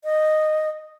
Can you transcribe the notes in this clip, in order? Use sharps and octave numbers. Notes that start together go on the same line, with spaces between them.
D#5